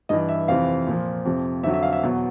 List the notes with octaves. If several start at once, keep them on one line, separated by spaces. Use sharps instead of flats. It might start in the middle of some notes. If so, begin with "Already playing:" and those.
G2 E3 D#5
E5
F2 C3 E3 F5
A#2 F3
F2 C3 F3
F2 D3 F#3 E5
E5
F5
E5
E2 B2 F#3